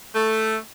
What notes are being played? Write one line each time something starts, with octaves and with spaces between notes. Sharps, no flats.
A3